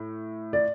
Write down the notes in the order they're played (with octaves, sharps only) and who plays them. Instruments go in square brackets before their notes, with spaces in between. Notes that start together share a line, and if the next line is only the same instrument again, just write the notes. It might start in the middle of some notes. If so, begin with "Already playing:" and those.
Already playing: [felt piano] A2
[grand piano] D5